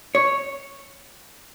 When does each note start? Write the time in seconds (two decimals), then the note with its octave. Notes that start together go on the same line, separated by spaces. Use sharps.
0.15 C#5